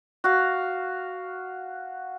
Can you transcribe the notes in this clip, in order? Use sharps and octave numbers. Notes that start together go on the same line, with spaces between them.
F#4 F5